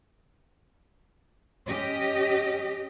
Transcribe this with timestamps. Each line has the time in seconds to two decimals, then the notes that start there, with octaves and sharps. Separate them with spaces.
1.66 C#4 G4 D#5